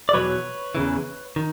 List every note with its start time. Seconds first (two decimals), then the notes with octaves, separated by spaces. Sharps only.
0.09 D5
0.13 E2 B2 F#3 B4 C#5
0.75 E2 C#3 E3
1.36 D#3